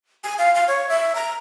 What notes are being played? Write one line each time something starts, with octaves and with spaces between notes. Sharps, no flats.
G#5
F5
F5
C#5
E5
A#5